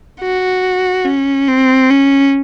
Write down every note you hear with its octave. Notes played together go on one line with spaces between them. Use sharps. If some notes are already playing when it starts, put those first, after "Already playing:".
F#4
C#4
C4
C#4